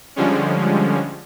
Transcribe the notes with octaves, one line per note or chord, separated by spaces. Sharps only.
D3 F3 G3 G#3 C#4